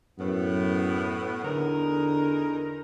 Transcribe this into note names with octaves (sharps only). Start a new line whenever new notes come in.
F#2 A2 B3
E2 D3 D#4 A#4